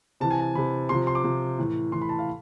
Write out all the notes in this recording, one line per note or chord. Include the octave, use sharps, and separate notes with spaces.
C3 E3 A5
G#5
A5
C3 E3 B5
C3 F3 C6
C6
D6
C3 F3
A2 E3
A2 E3 C6
B5
A5
F5